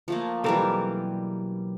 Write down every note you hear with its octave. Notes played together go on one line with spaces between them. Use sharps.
F3 A3 A#3
B1 E3 G3 C4 A4 A#4